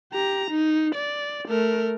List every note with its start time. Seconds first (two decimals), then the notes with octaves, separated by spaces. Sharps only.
0.12 G4 A#5
0.51 D#4
0.95 D5
1.48 A3 A#4